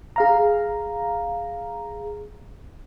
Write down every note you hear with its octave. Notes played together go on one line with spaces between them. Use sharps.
G#4 F5 A#5